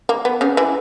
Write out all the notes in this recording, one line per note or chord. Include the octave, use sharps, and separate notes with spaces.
A#3
B3
C#3 C#4
E3 E4